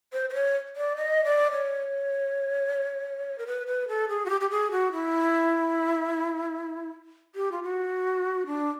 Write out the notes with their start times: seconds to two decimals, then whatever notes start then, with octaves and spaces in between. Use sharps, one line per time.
0.13 C5
0.30 C5
0.34 C#5
0.76 D5
0.97 D#5
1.25 D5
1.52 C#5
3.38 A#4
3.47 B4
3.67 B4
3.89 A4
4.09 G#4
4.26 F#4
4.30 G4
4.41 G4
4.51 G#4
4.71 F#4
4.92 E4
7.35 G4
7.52 F4
7.63 F#4
8.46 D4